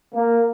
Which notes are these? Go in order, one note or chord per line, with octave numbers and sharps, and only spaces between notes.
A#3